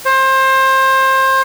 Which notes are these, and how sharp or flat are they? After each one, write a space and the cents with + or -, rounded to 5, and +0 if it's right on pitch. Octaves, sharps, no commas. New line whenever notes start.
C5 +25